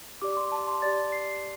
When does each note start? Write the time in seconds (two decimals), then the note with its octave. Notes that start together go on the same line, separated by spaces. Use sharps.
0.22 G4 D5 D6
0.32 D6
0.37 C6
0.52 A5
0.68 C6
0.82 G4 D5 A6
1.12 C7